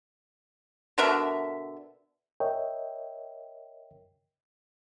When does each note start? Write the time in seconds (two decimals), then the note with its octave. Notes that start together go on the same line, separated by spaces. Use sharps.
0.98 B2 D3 A#4 E5
2.40 A#4 C#5 D#5 E5 G5